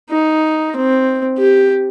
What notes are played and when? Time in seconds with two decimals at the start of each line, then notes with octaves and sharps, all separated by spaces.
0.10 D#4
0.76 C4
1.38 G4